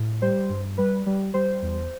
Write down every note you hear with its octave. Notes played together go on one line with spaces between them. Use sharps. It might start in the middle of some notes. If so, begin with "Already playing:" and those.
Already playing: A2
G3 C5
G2
G3 B4
G3
G3 C5
E2